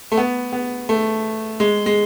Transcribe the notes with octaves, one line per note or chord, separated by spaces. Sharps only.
A3
B3
B3
A3
G#3
G#3